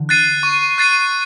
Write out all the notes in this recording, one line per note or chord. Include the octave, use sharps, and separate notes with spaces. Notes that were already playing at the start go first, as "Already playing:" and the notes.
Already playing: D3 E3
F#6 A6 C7 D#7
C#6
F#6 A6 C7 D#7